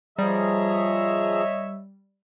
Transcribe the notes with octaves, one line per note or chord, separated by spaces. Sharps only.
F3 G3 G#4 C#5 D#5 E5 A#5